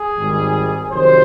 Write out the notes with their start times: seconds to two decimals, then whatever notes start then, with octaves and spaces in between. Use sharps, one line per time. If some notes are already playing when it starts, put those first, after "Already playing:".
Already playing: G#4
0.17 G#1 G#2 D#3 G3
0.91 F2 C3 D#3 F#3 C5